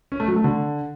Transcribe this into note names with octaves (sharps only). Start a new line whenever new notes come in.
C#4
A3
F#3
A3
D3